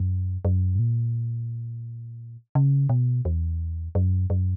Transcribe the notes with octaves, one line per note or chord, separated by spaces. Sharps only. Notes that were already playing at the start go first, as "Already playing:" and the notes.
Already playing: F#2
F#2
G2
A#2
C#3
B2
E2
F#2
F#2